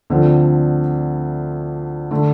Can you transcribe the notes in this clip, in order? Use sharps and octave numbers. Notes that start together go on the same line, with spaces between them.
D2 D3 F3 C4
D3 A3